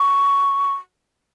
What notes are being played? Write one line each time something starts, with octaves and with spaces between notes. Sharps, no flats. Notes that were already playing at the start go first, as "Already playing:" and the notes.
Already playing: C#6